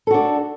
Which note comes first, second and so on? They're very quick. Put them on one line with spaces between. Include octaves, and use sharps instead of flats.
A4 F#4 D4